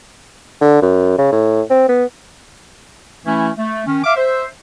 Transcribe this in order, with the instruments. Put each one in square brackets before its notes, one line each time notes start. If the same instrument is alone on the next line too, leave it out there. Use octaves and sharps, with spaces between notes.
[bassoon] D3
F#2
C#3
A2
C4
B3
[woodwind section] E3 A3 C#4 E4
A3
D#3 C#4
E5 F5 D6
C5 E5